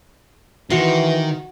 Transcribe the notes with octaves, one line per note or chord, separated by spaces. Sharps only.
D#3 E3 F#4 C6